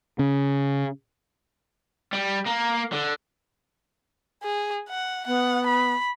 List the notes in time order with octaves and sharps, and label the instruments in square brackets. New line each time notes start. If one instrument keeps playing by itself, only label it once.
[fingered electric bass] C#3
[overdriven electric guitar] G3
A#3
D3
[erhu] G#4
F#5
[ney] B3 [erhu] F#5
[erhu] B5